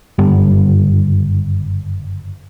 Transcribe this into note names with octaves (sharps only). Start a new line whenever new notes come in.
F#1 G2 D3 G3